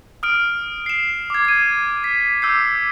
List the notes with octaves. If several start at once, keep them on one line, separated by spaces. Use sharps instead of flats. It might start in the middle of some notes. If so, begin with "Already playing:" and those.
D#6 F6 D7
C7 E7
D6 G#6
G#6 D#7
B6
D6 E6 G6 C7